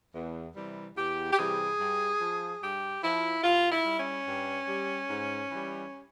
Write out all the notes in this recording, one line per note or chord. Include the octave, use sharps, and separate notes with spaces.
E2
C3 E3 G3
E2 G4
G4
C3 E3 G3 G#4
G2
F3
G2 G4
F3 E4
G2 F4
E4
G3
C#4
G2
G3
G#2
E3 G3